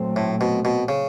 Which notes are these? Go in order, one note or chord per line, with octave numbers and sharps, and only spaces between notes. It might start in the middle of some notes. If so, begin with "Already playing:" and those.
Already playing: A#2 F#3 A3 C4
A2
B2
B2
C#3